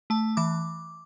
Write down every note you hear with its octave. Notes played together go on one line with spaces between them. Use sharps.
A3 A5
E3 D6